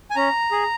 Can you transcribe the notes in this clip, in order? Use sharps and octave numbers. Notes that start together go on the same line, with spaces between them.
G#5
C#4 A#5
G#4